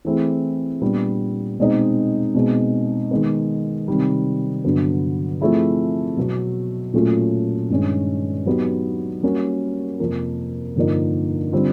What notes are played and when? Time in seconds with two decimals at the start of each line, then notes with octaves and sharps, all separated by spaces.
0.05 E3 A3 C4 E4 G#4
0.81 A#2 G3 B3 D4
1.59 B2 G#3 C4 D#4
2.34 B2 G#3 C4 D#4 G#4
3.11 D#3 G#3 B3
3.88 C3 D#3 G3
4.64 G2 D3 F#3 B3 D4
5.41 F3 A3 C4 E4 G#4
6.17 B2 F#3 B3
6.93 A#2 F#3 A3 C#4 F4
7.70 G2 D#3 G#3 C#4
8.46 F#3 B3 D#4 G4
9.23 G3 A#3 C#4 F#4
10.00 F2 C3 F3 A#3
10.76 G2 D3 F3 A#3 D#4
11.53 D3 G3 C4 F4